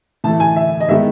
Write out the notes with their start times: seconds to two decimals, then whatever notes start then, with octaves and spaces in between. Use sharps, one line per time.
0.24 A2 E3 A3 A5
0.40 G#5
0.56 E5
0.80 D#5
0.89 D#3 G#3 B3 E5